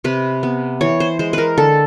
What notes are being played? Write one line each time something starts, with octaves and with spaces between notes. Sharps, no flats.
C3 B4
B3
E3 C#5
C5
G#3 C5
A#4 B4
D3 A4